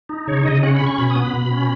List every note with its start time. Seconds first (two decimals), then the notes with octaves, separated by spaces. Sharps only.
0.09 D#4
0.27 C#3 C#5
0.45 C#3 D#5
0.63 C#4 F#5
0.74 B5
0.81 C#4
0.87 C#6
0.98 B2 B5
1.10 D#6
1.16 B3
1.22 B5
1.33 B2
1.51 C#4